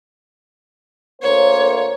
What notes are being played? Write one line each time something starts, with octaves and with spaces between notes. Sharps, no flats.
D2 A#3 C5 C#5